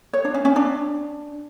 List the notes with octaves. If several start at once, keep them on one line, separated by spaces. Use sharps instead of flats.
C#5
D4
C#4
C#4
D4